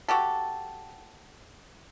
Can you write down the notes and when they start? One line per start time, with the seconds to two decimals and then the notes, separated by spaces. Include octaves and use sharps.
0.08 F#4 G4 A4